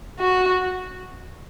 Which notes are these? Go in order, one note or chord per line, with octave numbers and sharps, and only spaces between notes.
F#4